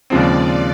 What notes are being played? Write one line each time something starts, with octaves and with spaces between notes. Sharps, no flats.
D#2 C#3 F3 G#3 C4 D5